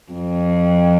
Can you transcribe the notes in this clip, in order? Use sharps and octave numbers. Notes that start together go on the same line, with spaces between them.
F2